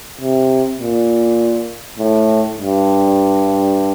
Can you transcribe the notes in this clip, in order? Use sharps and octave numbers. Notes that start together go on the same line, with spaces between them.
C3
A#2
A2
G2